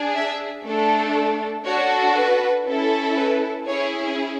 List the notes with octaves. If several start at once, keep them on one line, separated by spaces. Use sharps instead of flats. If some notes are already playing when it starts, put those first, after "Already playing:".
Already playing: D4 G#4
E5
A3 D4 A4
D4 F#4 A4 C#5
B4
C#4 E4 A4
B4
C#4 E4 G#4 C#5